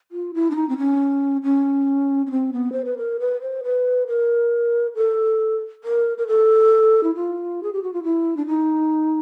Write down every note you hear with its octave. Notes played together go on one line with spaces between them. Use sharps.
F4
E4
D4
D#4
C4
C#4
C#4
C#4
C4
B3
C5
B4
A#4
B4
C5
B4
A#4
A4
A#4
A#4
A4
E4
F4
G#4
G4
F#4
F4
E4
D4
D#4